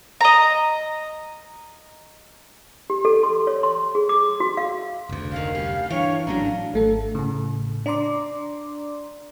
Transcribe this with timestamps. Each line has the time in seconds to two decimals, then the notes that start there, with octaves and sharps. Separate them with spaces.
0.21 D#5 A#5
2.90 G4
3.05 A4
3.23 C6
3.47 C#5
3.63 C6
3.95 G#4
4.09 D6
4.40 F#4
4.57 F5
5.09 F1 D2
5.32 D#3 C#4 F5
5.55 G3 C#4
5.91 G2 E3 C#5 F5
6.27 G#1 A2 D3 F#3 C#4 D4 A#5
6.74 G#1 A3 A4
7.15 A2 C#3
7.86 D4 D5 A#5 C6 D6